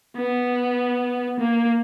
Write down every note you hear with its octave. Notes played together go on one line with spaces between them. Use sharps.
B3
A#3